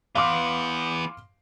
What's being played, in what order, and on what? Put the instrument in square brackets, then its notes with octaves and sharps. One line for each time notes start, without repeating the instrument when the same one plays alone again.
[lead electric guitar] E3 B3 [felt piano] F5 C6 D6